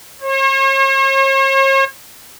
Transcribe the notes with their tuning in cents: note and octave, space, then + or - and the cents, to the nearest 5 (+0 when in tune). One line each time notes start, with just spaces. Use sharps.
C#5 -45